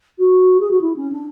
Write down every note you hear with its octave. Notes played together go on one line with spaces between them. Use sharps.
F#4
G#4
F#4
E4
C#4
D4